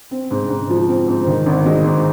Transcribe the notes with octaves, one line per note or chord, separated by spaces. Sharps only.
C4
G#2
G#2
F3
C4
G#2
D#3
G#1
G#3
G#2